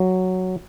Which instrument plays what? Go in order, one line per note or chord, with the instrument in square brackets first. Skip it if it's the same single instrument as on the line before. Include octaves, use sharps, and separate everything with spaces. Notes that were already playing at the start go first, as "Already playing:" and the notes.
Already playing: [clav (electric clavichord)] F#3